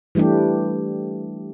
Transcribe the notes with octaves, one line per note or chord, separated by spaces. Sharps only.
E3 G3 A3 D4 G4